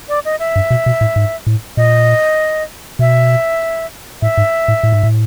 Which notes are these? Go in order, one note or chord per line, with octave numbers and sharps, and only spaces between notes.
D5
D#5
E5
G2
B2
B2
A2
G#2
A2
A#2 D#5
B2 E5
A2 E5
G#2
A2
A2
G#2
A2